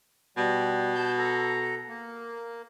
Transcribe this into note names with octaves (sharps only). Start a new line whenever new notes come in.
B2 G3
A5 G6
A4 A#5
A#3